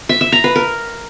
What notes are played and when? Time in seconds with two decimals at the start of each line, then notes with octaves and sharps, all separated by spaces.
0.09 E5
0.21 E5
0.32 A#5
0.44 B4
0.55 A#4